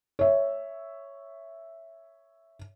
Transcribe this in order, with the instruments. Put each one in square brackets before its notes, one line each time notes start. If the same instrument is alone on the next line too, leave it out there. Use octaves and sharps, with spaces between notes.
[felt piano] C#5 E5